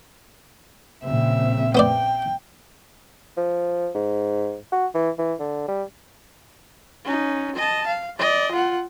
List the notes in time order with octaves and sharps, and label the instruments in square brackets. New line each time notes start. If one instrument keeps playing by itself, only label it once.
[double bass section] A#1 C#3 C4 [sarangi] E5
[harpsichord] B3 C5 D5 [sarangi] G5
[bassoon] F3
G#2
F#4
E3
E3
D3
G3
[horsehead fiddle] C#4 D#4
D#5 A5
F5
D5 D#5
F4 F#5